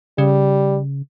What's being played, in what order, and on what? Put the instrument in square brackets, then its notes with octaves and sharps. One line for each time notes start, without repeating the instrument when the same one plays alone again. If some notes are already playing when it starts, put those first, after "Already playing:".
[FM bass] C#3 [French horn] G3